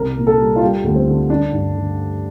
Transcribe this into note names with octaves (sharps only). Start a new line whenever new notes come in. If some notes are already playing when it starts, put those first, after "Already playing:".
Already playing: C2 A#4
A#2
A4
G3
F4
G3 G4
D2
C4
D3
G3 D4
G2
D3